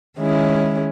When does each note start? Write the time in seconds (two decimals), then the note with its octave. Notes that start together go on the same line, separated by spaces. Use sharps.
0.18 D#3 G#3 C#4 E4